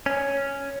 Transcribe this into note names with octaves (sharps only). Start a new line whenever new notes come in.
C#4